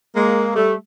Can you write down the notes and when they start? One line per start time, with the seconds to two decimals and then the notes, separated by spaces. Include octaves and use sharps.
0.16 G#3 A#3
0.56 G3 A3